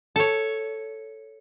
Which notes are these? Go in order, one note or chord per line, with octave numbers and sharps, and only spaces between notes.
A4 C#5